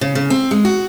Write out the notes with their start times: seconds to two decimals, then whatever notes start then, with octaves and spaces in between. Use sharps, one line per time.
0.01 C#3
0.15 C#3
0.30 C4
0.51 G#3
0.65 F#4